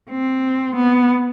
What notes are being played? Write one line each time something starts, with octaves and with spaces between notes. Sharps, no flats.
C4
B3